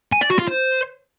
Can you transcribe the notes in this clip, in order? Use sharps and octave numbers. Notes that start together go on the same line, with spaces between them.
G#5
D5
F#4
F4
C5